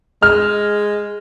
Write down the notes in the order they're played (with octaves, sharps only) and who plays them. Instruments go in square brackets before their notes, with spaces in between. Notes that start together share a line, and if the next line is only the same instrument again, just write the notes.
[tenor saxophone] G#3 [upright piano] F6